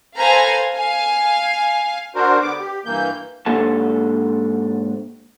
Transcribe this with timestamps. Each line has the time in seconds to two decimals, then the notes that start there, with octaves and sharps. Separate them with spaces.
0.17 A4 B4 C5 F5 G#5 A#5
0.74 F5 G#5
2.15 D4 F#4 A#4 C5
2.42 D3 B3 D6
2.60 G4
2.85 G2 E3 A#3 G6
3.46 G#2 A#3 D4 G4 A4 A5